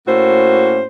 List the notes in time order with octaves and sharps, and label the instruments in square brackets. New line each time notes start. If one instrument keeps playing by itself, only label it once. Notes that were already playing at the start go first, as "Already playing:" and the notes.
[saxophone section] A2 A#3 C#4 F#4 C5